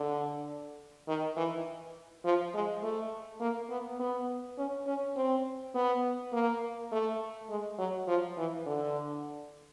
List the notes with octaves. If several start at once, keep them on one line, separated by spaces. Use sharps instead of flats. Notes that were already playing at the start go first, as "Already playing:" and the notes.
Already playing: D3
D#3
E3
F3
G#3
A3
A#3
B3
B3
C#4
C#4
C4
B3
A#3
A3
G#3
F#3
F3
E3
D3